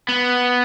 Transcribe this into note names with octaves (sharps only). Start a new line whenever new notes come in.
B3